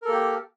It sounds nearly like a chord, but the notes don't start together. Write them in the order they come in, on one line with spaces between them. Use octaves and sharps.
A#4 A4 A#3 G4